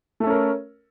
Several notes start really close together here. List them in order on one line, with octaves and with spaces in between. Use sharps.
A3 A4 C#4 A#4